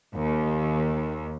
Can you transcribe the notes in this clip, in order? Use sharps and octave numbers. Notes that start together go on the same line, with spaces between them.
D#2